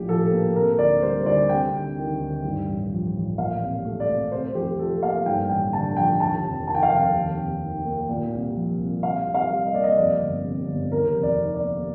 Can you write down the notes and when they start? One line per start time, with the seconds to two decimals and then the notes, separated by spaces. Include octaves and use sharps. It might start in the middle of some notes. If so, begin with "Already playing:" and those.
Already playing: A#1 A2 G4
0.08 F3 A4
0.32 A#3
0.55 C3 A#4
0.79 D2 D5
1.02 G3 C5
1.26 D2 D5
1.49 C3 G5
1.73 D2
1.97 D#3
2.20 D2
2.44 G2
2.67 A1
2.91 F3
3.15 A1
3.37 A#2 F5
3.61 C2
3.85 A3
4.00 D5
4.09 C2
4.32 C3 C5
4.55 F2 G4
4.79 F3 A4
5.03 A#3 F5
5.26 G2 G5
5.50 A1 G5
5.73 D3 A5
5.97 F3 G5
6.20 D#2 A5
6.44 F1
6.67 D#3 A5
6.75 G5
6.83 F5
6.90 F1 G5
7.15 D#2
7.38 F1
7.61 D#3
7.85 A#3
8.09 A#2
8.33 C2
8.56 F3
8.79 C2
9.03 C3 F5
9.27 C2
9.34 F5
9.49 G3
9.66 D#5
9.74 A#3 D5
9.84 D#5
9.97 F2 D5
10.21 G1
10.45 C3
10.68 G1
10.92 D#2 A#4
11.15 F1
11.23 D5
11.39 D#3
11.54 D5
11.63 A#3